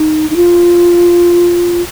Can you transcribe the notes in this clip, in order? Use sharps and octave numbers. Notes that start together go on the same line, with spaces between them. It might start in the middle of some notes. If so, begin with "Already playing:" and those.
Already playing: D#4
D#4
F4